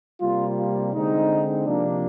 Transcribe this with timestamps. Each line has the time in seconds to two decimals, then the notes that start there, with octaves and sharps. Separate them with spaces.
0.20 C3 G3 A#3 F4
0.57 F4
0.93 D3 G#3 C4 D#4
1.66 C3 F3 A#3 D4